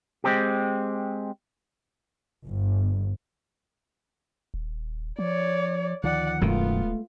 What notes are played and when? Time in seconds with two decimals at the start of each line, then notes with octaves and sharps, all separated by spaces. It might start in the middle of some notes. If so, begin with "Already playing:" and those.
0.24 G#3 C4 G4
2.46 G1
4.54 D#1
5.19 F3 C#5 D5
6.04 D2 D#3 F3 D5 F#5
6.41 D1 F#2 B2 D#3 G#3 A3 B3 F4